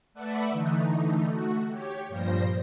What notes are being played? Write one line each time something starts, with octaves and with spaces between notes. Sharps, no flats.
A3 A4 B4 D5 E5 F#5
D3 E3 A3 D#4
A3 F#4
G4 C#5
G2 A#2 F3 G3 C5 A#6